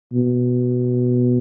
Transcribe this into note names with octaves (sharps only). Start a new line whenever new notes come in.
B2